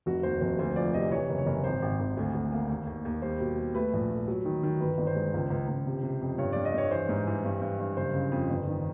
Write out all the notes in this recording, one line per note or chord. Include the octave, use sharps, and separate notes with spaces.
F1 F#4
D#2 C5
F1 C5
D2 C5
F3 D5
C3 D#5
E3 C#5
F#1
C#5
F#1
G#1 C5
G#1
G#1
D2
D2
A#3
D#2
D#2
D#2
G3 C5
B2
G3
A3 B4
A#1
A3
F#3
D#3
D#3
G1 B4
G1
C5
G#3
C#2
C#2
C#2
C3
C3
F2
G2 C#5
G2 D5
D#5
G2 C#5
E3 C5
G#2
E3
G2
G2
G2
F#1 C5
C#3
F2
G1
D#3